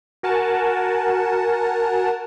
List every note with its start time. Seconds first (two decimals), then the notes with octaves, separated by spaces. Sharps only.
0.23 F#4 A#4 F#5 G#5 A5